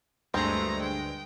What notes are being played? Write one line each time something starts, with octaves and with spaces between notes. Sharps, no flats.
D2 G2 G#3 A3 C4 A#5
G5